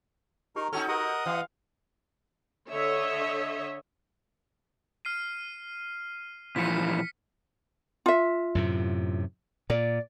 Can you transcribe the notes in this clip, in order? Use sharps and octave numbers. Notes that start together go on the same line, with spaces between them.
D#4 G4 A#4 A#5 C#6
C#4 D#4 F#4 A4 F6
G4 A#4 B4 D#5 F#5 D#6
E3 F5 G5
D3 C#5 D#5 E5
F6 C7 D#7
A#2 E3 F3 B6 C#7
F4 E5
F#2 A2 C3
A#2 D5